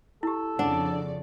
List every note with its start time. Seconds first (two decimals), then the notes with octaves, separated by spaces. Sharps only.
0.23 E4 G4 A4
0.59 F2 C#3 D4 D5 F#5